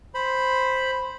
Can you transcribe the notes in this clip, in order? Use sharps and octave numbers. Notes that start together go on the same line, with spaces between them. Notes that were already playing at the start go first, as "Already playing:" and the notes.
C5 B5